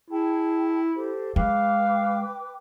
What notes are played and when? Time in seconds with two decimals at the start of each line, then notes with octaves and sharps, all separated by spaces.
0.10 E4 G#4 G5 A5
0.96 G4 A4 C5
1.36 G#3 B4 F5 G5 D6